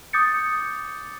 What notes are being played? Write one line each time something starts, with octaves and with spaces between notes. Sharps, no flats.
D6 D#6 G6 A6 C#7